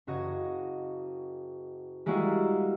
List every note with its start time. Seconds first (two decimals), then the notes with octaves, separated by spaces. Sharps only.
0.07 F#1 F#4 D#5 G#6
2.06 G3 G#3 A#3 E4 F#4 G#4